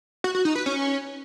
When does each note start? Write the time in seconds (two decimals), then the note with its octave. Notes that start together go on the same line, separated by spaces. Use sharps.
0.24 F#4
0.35 F#4
0.45 D#4
0.55 B4
0.66 C#4